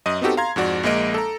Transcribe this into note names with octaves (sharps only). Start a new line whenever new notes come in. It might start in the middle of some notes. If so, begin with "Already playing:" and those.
F#2 D#5 D#6
B3 C4 D#4 F#4 G4 A4
F5 A#5 C6 G#6
F2 G#2 F#4 D5
A#1 G#3 A#3 D#5 D7
A4 A#5